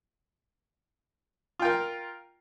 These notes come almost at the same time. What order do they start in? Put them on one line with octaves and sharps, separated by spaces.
F4 G5 A#4